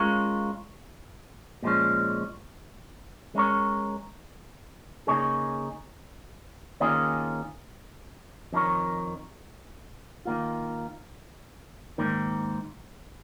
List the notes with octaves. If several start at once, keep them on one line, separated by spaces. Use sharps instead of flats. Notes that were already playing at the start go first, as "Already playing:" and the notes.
Already playing: G#3 C#4 F4 A#4 C#5
A#2 F3 G#3 C#4
G#3 C#4 A#4 C#5
C#3 A#3 D#4 G#4 C#5
D#3 A#3 C#4 F4 G#4
F2 D#3 C#4 A#4 C#5
D#3 A#3 F4
G#2 D#3 A#3